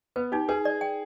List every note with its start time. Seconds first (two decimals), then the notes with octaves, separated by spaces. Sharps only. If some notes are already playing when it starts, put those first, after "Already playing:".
0.16 B3 B4
0.32 D#4 G4
0.49 G#4 B4
0.65 D5
0.81 G5